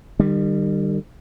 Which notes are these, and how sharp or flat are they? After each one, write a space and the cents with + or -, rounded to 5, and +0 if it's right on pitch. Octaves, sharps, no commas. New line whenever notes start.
D#3 -45 G3 +0